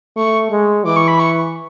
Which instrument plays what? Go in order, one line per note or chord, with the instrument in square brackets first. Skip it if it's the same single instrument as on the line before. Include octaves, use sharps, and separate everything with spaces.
[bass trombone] A3 [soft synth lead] C#6
[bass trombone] G#3
[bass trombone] E3 [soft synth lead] D6
[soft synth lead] C#6
B5
C#6